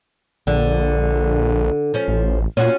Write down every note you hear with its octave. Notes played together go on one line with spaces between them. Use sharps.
A#1 D3
F3 C#4
A1
A#2 C#4 F4 F#4